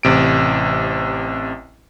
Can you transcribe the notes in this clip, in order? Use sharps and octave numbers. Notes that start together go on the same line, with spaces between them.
A1 C3 D7